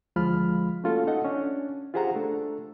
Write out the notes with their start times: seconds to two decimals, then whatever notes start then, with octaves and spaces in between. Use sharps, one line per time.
0.16 D2 F3 G#3 F4 B5 F6
0.84 A3 A#3 C#4 F4 F#4 A4
1.07 D#4 A4 D#5 F#5
1.24 C#4 D4
1.94 F4 G4 G#4 C5 F#5 A#5
2.15 A3 D4 A4